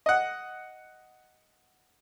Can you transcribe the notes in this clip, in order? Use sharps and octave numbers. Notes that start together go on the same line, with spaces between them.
D#5 F#5